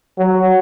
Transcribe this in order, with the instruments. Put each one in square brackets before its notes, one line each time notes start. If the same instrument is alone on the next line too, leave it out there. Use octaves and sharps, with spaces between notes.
[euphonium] F#3